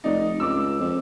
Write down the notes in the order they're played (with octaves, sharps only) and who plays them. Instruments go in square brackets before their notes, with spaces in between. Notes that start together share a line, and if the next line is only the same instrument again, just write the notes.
[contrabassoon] F1 [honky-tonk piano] D#4 D5
[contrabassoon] C#2 [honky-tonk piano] D6 E6
[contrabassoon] F2